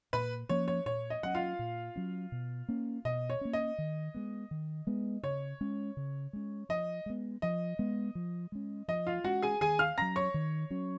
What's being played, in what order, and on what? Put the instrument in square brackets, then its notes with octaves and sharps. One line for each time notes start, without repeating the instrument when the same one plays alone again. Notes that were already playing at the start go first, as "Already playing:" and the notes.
[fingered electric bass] A#2 [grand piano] B4 B5
[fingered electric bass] F3 A#3 C#4 [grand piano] C#5
[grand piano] C#5
[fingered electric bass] A#2 [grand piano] C#5
[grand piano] D#5
[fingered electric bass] F#3 C#4 [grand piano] F#5
[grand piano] F4 F5
[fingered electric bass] A#2
F#3 C#4
B2
A#3 C#4
[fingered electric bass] B2 [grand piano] D#5
[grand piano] C#5
[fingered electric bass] A#3 C#4
[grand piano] D#5
[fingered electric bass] D#3
G#3 B3
D#3
G#3 B3
[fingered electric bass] C#3 [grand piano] C#5
[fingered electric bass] G#3 C#4
C#3
G#3 C#4
[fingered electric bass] F3 [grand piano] D#5
[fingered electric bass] G#3 B3
[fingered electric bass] F3 [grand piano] D#5
[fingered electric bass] G#3 B3
F3
G#3 C#4
[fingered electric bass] F3 [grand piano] D#5
[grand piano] F4 F5
[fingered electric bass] G#3 C#4 [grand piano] F#4 F#5
[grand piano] G#4 G#5
[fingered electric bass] D#3 [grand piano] G#4 G#5
[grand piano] F5 F6
[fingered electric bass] F#3 C#4 [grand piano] A#5 A#6
[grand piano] C#5 C#6
[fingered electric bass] D#3
F#3 C#4